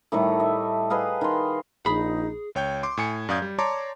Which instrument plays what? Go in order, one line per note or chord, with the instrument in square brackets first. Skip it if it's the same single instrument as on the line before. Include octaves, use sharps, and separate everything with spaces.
[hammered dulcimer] A2 D#3 G3 A3
D#5 E5
G#4 B4 D#5 F5
D#3 C6
[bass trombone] A#1 [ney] D#4 [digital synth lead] G#4 [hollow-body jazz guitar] B5
[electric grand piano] C#2 C#5 G5 G6
C6 D6
A2 G#5 C#7
F#2 D5 F5 D#6 G6 G#6
G3
C#5 D5 A5 A#5 C6 D6